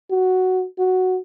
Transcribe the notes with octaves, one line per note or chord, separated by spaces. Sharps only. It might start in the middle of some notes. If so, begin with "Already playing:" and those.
F#4
F#4